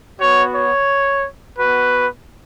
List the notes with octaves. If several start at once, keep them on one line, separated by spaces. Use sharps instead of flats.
B3 F#4 C#5
C#5
B3 F#4 B4